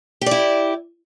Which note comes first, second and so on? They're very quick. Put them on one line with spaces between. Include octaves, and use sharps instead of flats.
G4 D5 E4